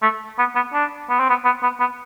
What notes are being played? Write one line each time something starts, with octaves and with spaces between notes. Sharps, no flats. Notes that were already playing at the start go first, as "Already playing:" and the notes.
A3
B3
B3
D4
B3
C4
B3
B3
B3
B3